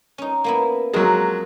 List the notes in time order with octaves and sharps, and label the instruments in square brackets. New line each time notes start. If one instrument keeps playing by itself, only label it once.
[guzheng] C#4 D#4
A#3 B3 E4
[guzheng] F3 C4 A#4 [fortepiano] F#3 G#3